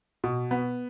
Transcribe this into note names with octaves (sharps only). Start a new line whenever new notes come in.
B2
B3